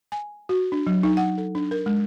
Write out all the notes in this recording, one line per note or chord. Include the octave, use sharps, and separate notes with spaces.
G#5
F#4
D4
F#3
D#4
F#5
A4
D4
A#4
G#3